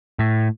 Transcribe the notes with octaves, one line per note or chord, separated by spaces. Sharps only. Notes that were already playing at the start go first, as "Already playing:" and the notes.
A2